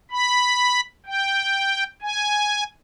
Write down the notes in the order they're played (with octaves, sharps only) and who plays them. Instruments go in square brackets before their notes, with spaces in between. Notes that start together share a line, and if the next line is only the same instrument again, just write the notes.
[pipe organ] B5
G5
G#5